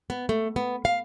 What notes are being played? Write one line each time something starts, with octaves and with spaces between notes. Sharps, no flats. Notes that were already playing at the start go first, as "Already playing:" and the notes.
B3
A3
B3
F5